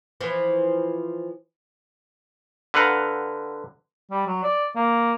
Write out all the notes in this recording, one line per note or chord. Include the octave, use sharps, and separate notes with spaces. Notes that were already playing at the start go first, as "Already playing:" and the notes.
E3 F3
D3 B4 F5 F#5 A#5
G3
F#3
D5
A#3